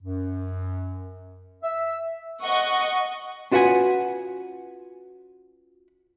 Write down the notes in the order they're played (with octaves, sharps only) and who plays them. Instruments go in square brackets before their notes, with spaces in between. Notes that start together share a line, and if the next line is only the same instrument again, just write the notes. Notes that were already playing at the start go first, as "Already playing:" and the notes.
[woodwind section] F#2
E5
[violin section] D#5 F#5 C#6
[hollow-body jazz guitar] C#4 F4 F#4 B4 F#5 G#5